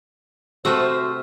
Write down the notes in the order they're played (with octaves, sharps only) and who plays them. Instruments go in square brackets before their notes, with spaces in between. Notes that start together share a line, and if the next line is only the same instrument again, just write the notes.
[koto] C3 A3 B4 [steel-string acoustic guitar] F#4 A5 [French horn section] C5 [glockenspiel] E6 F6